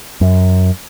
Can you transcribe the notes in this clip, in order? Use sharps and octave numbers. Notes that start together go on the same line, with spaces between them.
F#2